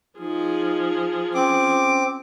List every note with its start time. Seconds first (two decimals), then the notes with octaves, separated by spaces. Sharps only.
0.19 F3 D#4 G#4
1.35 C4 C#4 D6